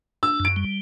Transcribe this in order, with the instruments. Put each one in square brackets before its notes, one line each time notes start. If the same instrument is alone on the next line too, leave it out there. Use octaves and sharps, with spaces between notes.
[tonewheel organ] D4 [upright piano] E6
[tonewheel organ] F#2 [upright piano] D7
[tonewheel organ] G3